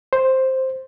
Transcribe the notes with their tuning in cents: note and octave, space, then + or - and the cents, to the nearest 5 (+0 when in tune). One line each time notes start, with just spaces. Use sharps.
C5 +5